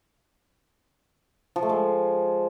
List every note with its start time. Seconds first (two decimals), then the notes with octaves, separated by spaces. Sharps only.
1.56 F3
1.63 A3
1.69 G#3